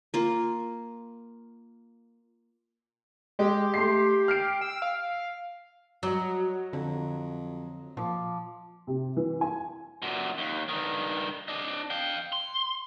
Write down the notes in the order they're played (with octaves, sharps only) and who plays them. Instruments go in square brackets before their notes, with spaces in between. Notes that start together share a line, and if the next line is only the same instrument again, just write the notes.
[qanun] A#3 F4
[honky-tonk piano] G#3 [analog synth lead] G4
[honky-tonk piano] A3 C6 C7
F6 C7 D7
[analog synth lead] E6
F5
[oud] F#3 [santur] D#5 A#5
[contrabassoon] F2 [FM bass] D3
[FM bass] A#2 [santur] F3 D6
[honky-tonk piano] C3
E3
G#5
[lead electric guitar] F#2 A#2
D#2
G2 D#3
D4 D#5
F5 G5
C6